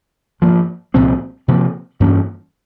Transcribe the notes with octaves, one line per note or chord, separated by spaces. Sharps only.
G#2 F3 A#3
C2 A#2 F3 C4
C3 F3 A#3
G2 E3 A#3 C#4